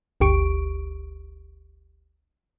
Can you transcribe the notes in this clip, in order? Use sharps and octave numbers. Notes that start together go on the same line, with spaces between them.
G1 D2 G4 C#6 D7